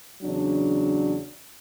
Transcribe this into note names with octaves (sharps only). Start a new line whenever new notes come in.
E2 C#3 F#3 D4